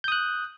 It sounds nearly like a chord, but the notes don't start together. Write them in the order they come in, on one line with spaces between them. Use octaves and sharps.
G6 D#6 F#6